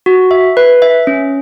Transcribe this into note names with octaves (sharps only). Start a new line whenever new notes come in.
F#4
E5
B4
E5
C#4